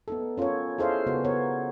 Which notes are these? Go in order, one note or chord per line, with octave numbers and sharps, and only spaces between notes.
B3 D#4 A4
C#4 F4 A4 A#4 C#5
E4 G#4 A4 C5 D#5 F5
C#3 B3 F#4
B3 A#4 C#5